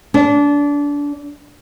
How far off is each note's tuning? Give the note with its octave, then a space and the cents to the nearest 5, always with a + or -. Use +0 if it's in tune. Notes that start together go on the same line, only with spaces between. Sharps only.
D4 -25